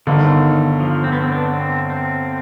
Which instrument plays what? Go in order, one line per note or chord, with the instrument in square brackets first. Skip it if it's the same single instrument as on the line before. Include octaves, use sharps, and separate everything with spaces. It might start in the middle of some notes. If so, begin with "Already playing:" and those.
[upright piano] G1 G2 D3 [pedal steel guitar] D#3
[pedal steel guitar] F3
C4
B3
C4
B3 D4
C4
C4